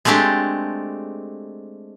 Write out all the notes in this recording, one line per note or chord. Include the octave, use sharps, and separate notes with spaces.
G#3 A3 C4 D4 G4